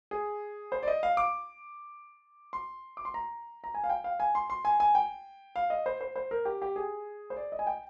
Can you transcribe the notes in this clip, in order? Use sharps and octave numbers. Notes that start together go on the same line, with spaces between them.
G#4
C5
D5
D#5
F5
D6
C6
D6
C6
A#5
A#5
G#5
F5
G5
F5
G#5
C6
C6
G#5
G#5
G5
F5
D#5
C5
C5
C5
A#4
G4
G4
G#4
C5
D5
D#5
G#5
G5